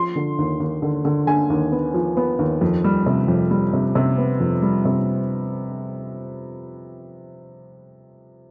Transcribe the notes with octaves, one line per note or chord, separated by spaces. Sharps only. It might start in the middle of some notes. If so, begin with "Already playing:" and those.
Already playing: F3 C6
D3
D#2
D#2
D3
D3
D3 G#5
D#2
B3
F3
B3
D#2
F2
G3
C3
F2
G3
C3
C3
B3
F2
G3
C3